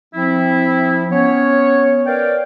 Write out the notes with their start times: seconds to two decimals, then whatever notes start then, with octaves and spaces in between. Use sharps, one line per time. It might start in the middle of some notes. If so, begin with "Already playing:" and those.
0.15 F3 C4 E4
1.11 B3 C#4 C#5
2.05 A#4 B4 C#5 D5 F5 G5